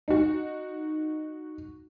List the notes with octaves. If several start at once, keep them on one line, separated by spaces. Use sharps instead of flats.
D#4 F#4